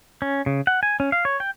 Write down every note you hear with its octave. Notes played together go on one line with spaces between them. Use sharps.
C#4
C#3
F#5
G#5
C#4
F5
C#5
G5